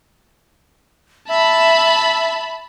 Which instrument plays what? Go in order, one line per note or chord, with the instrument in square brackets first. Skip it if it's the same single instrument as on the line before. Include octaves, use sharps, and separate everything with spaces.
[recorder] E5 [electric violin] A5 B5